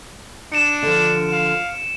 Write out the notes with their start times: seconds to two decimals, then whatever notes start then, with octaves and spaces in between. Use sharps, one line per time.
0.52 D4 C#7 D7 E7
0.82 D3 F3
1.32 F5